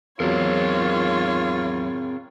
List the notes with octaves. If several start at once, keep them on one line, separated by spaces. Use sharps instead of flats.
E2 F#3 C4 F4 G#4 A#4 C#5